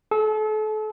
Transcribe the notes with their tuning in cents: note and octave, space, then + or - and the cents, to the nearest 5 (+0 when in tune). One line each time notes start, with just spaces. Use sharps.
A4 -35